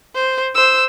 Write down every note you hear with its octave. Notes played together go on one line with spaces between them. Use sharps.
C5
C5 E6